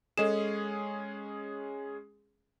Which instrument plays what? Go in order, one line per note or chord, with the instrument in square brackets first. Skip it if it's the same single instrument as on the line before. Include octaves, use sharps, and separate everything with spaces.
[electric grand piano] G#3 C#4 G#4 [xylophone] A4 D#5 E7